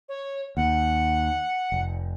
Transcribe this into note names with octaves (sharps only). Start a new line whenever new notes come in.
C#5
D#2 F#5
F1